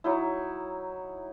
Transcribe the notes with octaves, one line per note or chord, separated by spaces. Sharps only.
F#3 D#4 E4